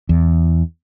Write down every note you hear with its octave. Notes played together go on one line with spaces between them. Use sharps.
E2